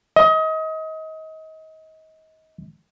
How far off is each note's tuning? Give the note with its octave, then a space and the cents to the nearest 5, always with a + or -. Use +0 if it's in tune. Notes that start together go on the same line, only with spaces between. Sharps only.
D#5 +30